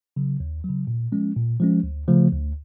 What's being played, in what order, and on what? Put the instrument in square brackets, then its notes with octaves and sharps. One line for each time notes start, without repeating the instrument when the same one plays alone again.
[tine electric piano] C#3 F#3
D#2
C#3 F#3
A#2
F3 G#3 C#4
A#2
F3 G#3 C#4
D2
C#3 F3 A3
D2